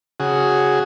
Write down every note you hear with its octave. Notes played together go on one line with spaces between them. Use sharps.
C#3 F#4 G#4